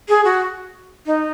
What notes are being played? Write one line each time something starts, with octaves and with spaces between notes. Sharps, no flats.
G#4
F#4
D#4